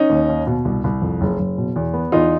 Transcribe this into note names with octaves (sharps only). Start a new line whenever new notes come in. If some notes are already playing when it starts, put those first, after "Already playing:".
Already playing: C#4 D#4
D#2
D#2
B2
C2
C2
F2
F#1
F#1
B2
E2
B3
E2 D#4 F4